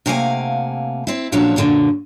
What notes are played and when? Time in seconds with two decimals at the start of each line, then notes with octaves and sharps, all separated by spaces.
0.06 C3 A3 A#3 F5 F#5 G#5
1.07 C4 E4
1.32 A#2 D3 F3 F#3 C#4 F#4
1.56 F#2 A#2 D3 E3 F#3